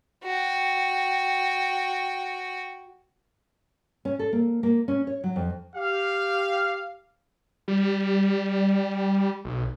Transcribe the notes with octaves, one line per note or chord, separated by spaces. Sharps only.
F#4 G5
C#4
A4
A#3
A#3
C#4
C#5
F#3
F2
G4 F5
G3
B1